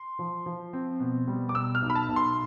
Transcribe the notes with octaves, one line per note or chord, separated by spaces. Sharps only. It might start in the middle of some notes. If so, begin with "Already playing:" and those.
Already playing: C6
F3
F3
C4
B2
G3
D6
B2 E6
F6
B1
B5
A5
B1
C6